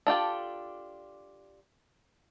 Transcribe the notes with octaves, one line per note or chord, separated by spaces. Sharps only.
D4 F4 G4 A4